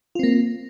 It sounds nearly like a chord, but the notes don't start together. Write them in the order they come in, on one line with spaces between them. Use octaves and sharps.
F4 C4 A#3